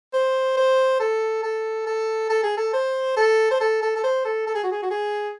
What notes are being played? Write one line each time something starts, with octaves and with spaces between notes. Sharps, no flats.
C5
C5
A4
A4
A4
A4
G#4
A4
C5
A4
C5
A4
A4
A4
C5
A4
A4
G#4
F#4
G#4
F#4
G#4